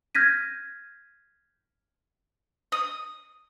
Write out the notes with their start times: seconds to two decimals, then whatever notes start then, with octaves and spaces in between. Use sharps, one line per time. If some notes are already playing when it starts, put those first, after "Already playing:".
0.15 F6 G6 G#6 A#6 B6 D#7
2.72 D#6